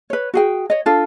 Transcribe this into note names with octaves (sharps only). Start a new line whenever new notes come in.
B4 C#5
F#4 G#4 G5
C#5 D#5
D4 F4 A4